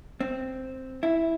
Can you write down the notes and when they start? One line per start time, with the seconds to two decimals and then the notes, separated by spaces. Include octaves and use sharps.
0.20 C4
1.03 E4